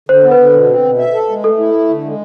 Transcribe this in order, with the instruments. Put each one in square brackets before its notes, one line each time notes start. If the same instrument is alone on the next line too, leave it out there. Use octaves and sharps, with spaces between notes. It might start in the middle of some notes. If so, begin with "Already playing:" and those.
[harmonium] D3 [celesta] C5
[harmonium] B3
[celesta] B4
[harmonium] D3
B2
C4
B2
E5
A4
G#3
[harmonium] A3 [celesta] A4
[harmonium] E4
A3
D3
G#3